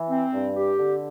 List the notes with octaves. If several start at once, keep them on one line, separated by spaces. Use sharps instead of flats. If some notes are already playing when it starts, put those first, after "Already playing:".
Already playing: E3
C4
G2
G4
D3